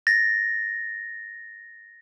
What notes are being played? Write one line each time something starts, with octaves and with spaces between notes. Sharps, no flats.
A6 A#6